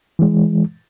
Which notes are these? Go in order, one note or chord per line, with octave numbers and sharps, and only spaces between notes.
E3 G#3